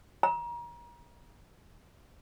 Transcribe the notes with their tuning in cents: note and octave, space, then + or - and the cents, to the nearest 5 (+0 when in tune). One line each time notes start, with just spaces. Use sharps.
A#5 +30